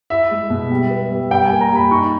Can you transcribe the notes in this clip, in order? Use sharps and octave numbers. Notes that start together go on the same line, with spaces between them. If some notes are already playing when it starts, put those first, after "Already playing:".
E4 E5
G#3
B2
G3
B3
G3
G3 G5
G#5
A#3
A#5
G3
B5
D#4 C#6